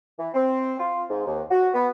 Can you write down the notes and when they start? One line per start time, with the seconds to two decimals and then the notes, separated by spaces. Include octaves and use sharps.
0.19 E3
0.34 C4
0.79 F4
1.10 G#2
1.26 D#2
1.51 F#4
1.74 B3